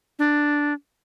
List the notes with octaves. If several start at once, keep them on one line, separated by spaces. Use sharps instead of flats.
D4